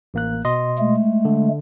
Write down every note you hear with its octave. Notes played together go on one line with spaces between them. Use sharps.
A1 A#3 F#6
B2 D#5 C6
G#3 A3
D3